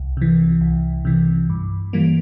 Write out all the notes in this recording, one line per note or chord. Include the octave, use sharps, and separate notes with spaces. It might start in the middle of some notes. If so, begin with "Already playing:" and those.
Already playing: C2
C3 E3
C2
C3 E3
G2
E3 G3 A#3